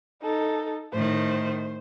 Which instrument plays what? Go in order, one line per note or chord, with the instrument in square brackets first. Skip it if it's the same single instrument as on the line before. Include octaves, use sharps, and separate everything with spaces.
[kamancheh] D#4 A4
[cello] A2 D#3 [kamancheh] C5